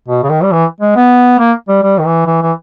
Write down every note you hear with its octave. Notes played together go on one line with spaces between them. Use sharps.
B2
C#3
D#3
G3
E3
G#3
B3
A#3
G3
G3
D#3
E3
E3
E3